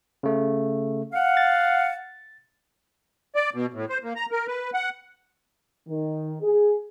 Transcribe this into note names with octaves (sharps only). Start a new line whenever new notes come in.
C#3 A3
F5 F#5
A6
D5
B2
A2
C5
A#3
A#5
A#4
B4
F#5
D#3
G#4